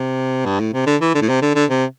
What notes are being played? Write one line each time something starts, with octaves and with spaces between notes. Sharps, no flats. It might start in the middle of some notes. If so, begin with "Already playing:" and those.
Already playing: C3
G2
A2
C3
D3
E3
D3
A2
C3
D3
D3
C3